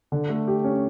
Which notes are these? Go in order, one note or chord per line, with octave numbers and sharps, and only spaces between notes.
D3
A3
G4
C#4